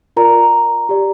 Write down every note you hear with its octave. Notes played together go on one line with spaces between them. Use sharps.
F4 A#4 D5 A#5
G4 D5